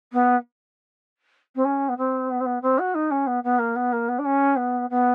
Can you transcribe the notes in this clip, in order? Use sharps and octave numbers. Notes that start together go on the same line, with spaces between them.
B3
C4
C#4
B3
C4
B3
C4
B3
C4
F#4
D#4
C#4
B3
B3
A#3
B3
A#3
B3
D4
C#4
B3
B3